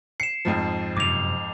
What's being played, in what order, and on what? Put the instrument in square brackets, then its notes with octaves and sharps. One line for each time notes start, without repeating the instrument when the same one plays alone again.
[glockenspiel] C7 E7 [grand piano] C#7
[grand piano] F2 G#2 F3
[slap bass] F#2 C3 [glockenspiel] D6 F7